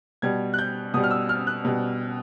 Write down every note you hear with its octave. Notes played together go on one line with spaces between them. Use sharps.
B2 G3 G#6
F#6
G6
B2 G3 D#6
F6
E6
F6
F#6
B2 G3